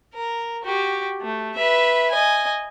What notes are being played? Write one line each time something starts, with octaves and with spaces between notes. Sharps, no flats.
A#4
F#4 G4
A3
B4 E5
D#5 G#5